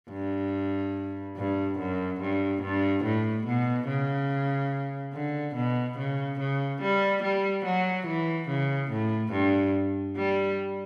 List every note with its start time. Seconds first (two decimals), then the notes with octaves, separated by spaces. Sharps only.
0.11 G2
1.37 G2
1.79 F#2
2.21 G2
2.62 G2
3.04 A2
3.46 B2
3.88 C#3
5.13 D3
5.55 B2
5.98 C#3
6.40 C#3
6.82 G3
7.23 G3
7.65 F#3
8.07 E3
8.48 C#3
8.91 A2
9.32 G2
10.16 G3